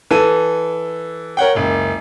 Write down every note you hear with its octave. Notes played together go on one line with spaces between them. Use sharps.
E3 A4 D#7
A#4 C#5 F#5 G5
F#1 C#2